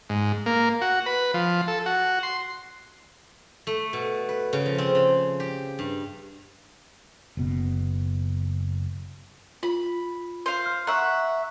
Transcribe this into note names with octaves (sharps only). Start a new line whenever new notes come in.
G#2
A#3
F#4
B4
F3
A4
F#4
C6
A3
B2
B4
C#3
F3
C4
C#3
G4
G2
F#1 B2
F4 B5
C5 F5
F6
E5 F#5 A#5 C#6 F#6